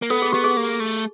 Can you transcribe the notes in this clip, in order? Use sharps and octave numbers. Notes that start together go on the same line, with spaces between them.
A#3
B3 A4
G#4
B3 G4
G#4
A#3
A3